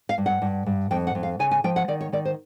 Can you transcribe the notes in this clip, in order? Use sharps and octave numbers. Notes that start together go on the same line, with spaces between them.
F5
G2
F#5
G2
G2
F2 G5
F#5
F2
F5
C#3 G#5
G#5
F3 G5
F#5
D#3 D5
C#5
D#3 D5
C5